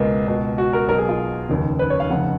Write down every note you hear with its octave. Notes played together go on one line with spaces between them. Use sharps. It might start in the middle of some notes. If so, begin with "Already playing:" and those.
Already playing: C#2 B2 G#3 A#3 B3
C#2 B2
F#4
A#4
B1 B2 A#4
G#4
F4
F1 D#2 C#3
B4
C#5
F5
F1 F2 C#3 F#5